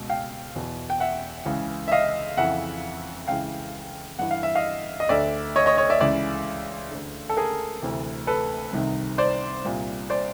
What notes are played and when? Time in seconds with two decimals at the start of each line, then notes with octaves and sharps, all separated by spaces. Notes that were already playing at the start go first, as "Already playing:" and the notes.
Already playing: C#2 B2
0.09 F5 G5
0.56 E2 B2
0.90 G5
1.00 E5 F#5
1.46 C#2 C#3 E3
1.88 E5
1.92 D#5 F5
2.37 F2 C#3 E3 E5 F#5
3.28 C#2 C#3 E3 F5 G5
4.19 G2 E3 F#5
4.31 F5
4.43 E5
4.55 D#5 F5
5.00 D#5
5.09 D2 D3 D5 E5
5.56 C#5 D#5
5.66 C#5 D#5
5.77 C#5 D#5
5.90 D5 E5
6.00 C#2 C#3 E3 D5 E5
6.91 D2 D3
7.30 A4
7.37 G#4 A#4
7.82 D2 C3 E3
8.27 A4 B4
8.73 C2 C3 D#3
9.18 C5 D5
9.65 C2 A#2
10.10 C5 D5